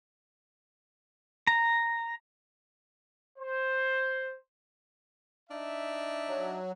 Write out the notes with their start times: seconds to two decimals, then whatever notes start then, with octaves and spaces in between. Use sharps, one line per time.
1.47 A#5
3.39 C5
5.49 D4 D#4 E5
6.27 F#3